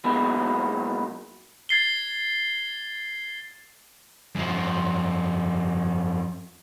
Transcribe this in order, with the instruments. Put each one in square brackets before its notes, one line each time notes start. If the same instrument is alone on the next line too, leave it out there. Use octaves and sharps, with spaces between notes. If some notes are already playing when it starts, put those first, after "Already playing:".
[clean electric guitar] B2 F#3 G#3 A#3 B3 E4
[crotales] G#6 A6 C7 G7
[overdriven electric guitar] F#2 F3